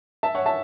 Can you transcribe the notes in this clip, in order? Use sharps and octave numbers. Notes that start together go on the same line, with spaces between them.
E5 A5
C#5 F#5
E5 A5